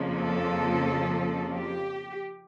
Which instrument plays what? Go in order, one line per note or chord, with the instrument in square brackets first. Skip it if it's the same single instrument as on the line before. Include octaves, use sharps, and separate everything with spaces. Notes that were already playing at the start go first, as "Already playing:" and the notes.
Already playing: [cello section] F2 C#3 F3 A#3
A4
G4